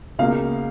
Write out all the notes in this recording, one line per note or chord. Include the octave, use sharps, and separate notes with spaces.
C#2 B2 A#3 F5